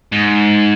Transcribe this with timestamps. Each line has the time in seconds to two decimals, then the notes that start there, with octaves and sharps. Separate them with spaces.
0.12 G#2